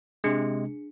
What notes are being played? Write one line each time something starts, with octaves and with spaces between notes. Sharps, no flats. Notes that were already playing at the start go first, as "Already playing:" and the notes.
C3 G#3 D4 G#4 C#7